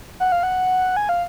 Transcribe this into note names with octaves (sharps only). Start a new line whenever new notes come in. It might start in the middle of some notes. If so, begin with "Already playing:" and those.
F#5
F5
F#5
G#5
F5